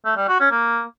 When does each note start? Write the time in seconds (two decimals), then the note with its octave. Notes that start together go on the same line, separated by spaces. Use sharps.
0.05 A3
0.17 G3
0.28 F#4
0.40 C#4
0.51 A#3